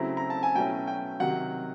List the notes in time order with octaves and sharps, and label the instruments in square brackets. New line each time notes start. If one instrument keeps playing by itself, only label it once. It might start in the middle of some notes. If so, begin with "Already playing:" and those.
Already playing: [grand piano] C#3 F#3 A3 C4 E4 A#5
A#5
A5
G#5
B2 F#3 A3 C#4 E4 G5
G5
C3 D#3 F#3 F#5